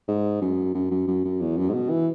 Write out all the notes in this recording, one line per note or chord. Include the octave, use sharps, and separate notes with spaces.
G#2
F#2
F#2
F#2
F#2
F#2
E2
F#2
G#2
B2
E3